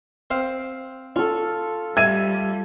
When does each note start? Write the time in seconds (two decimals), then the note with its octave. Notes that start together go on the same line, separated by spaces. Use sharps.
0.31 C4 C5 F5
1.16 C#4 F4 A4
1.97 G3 E5 G#6 D#7